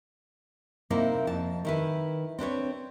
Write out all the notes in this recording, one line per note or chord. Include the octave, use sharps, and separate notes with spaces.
C3 A#3 C4 D#4 E4
F2 A5
D#3 E4 B4
C4 D4 B4 C#5